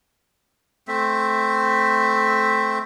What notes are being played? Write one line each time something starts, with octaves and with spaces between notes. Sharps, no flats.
A3 C4 E5